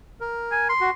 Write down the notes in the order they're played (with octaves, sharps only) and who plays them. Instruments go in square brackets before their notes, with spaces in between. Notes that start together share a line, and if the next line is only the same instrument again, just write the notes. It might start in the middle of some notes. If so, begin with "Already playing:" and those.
[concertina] A#4
[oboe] G#5
C6
[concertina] F#4